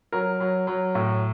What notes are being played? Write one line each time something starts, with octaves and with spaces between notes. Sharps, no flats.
F#3 A#4
F#3
F#3
A2